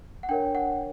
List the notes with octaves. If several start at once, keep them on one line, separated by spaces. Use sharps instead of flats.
F#5
D4 A#4 C#5 G5
F#5